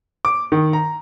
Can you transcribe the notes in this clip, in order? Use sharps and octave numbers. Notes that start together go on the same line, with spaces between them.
D6
D#3
A#5